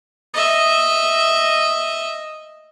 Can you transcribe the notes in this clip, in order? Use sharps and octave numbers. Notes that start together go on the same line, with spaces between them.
D#5 E5